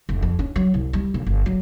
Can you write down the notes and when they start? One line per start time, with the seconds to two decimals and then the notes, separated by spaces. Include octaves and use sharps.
0.09 F1
0.22 F2
0.39 C#4
0.56 F#3
0.74 C2
0.93 G3
1.14 B1
1.27 G1
1.46 F#3